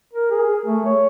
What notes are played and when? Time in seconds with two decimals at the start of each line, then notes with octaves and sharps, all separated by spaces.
0.13 A#4
0.31 G#4
0.66 A3
0.86 C#5